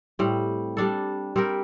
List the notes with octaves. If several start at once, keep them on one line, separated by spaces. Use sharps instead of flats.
A2 G3 C4
G3 D4 A4
G3 C4 G4 A#4